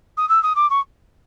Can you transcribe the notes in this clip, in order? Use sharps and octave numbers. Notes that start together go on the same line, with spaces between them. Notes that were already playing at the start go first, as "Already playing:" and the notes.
D#6
E6
D#6
D6
C#6